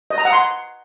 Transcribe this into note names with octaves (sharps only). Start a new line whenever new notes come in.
D#5
A#5
F#5
C6